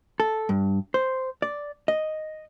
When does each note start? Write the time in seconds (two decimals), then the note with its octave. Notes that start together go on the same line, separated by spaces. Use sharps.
0.20 A4
0.49 G2
0.94 C5
1.42 D5
1.88 D#5